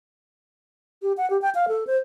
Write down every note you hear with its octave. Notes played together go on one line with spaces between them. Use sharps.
G4
F#5
G4
G5
F5
A4
C5